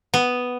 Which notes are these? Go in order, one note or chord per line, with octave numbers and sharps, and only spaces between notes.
B3